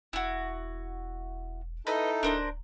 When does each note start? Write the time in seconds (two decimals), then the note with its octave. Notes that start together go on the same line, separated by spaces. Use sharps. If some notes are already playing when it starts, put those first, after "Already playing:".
0.13 E1 E4 F#4
1.87 D#4 E4 A4 B4 D#5
2.23 D1 D4 A#4 C5